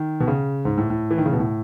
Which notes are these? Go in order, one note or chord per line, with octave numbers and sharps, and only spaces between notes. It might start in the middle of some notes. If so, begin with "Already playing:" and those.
Already playing: D#3
B2
C#3
G#2
A2
A2
E3
D#3
C#3
B2
A2